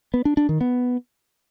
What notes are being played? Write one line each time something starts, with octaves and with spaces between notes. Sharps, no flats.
B3
D4
D4
D#3
B3